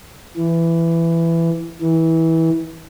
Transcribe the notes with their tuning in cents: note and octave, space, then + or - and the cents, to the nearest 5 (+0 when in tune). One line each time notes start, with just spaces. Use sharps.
E3 +15
E3 -20